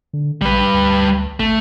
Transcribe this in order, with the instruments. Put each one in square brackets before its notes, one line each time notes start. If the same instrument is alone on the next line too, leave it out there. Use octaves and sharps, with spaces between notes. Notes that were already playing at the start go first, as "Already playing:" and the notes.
[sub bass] D3
[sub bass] A#1 [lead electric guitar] G3 B4
[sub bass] D2
[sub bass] G#1 [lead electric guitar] A3